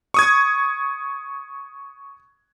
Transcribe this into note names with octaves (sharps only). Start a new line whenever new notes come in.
C#6 D#6 G#6